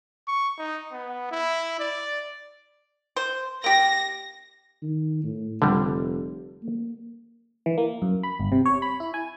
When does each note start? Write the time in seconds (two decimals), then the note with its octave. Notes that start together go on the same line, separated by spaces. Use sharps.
0.28 C#6
0.58 D#4
0.92 B3
1.31 E4
1.80 D5
3.16 C5
3.64 A#3 G4 A#6
4.82 D#3
5.23 A2
5.62 F1 D3 G3
6.63 A#3
7.66 E3
7.78 A#3
8.02 F#2
8.23 B5
8.39 G1
8.52 C3
8.66 C#5
8.82 B5
9.00 E4
9.14 G#5